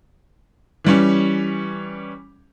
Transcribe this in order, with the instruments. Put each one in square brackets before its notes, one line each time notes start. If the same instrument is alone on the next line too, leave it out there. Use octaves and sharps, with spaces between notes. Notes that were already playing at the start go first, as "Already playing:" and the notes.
[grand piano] E3 G3 C#4